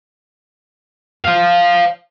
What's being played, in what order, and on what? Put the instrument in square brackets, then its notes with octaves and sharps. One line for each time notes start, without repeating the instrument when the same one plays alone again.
[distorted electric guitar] C5 F5